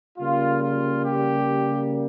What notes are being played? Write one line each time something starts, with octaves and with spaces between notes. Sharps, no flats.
C#3 G3 A#3 F4
F4
G4